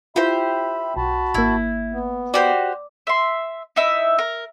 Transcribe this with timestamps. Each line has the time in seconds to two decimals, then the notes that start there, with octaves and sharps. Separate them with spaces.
0.16 E4 F4 G4 C5 E5 B5
0.97 B1 F#4 A5 B5
1.34 G#1 A#3 E4
1.92 B3
2.34 F#4 G4 C5 D5 D6
3.07 E5 C6
3.76 D#4 E4 E5
4.19 A#4